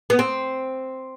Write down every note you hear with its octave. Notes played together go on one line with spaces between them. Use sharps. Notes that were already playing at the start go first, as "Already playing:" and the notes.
B3
C4